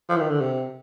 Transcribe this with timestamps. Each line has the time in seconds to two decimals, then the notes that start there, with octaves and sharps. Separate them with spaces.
0.09 F3
0.16 E3
0.20 D#3
0.30 D3
0.41 C3